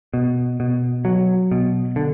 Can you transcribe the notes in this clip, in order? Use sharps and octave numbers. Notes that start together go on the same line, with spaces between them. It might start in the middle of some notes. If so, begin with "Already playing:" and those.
B2
B2
F#3
B2
D3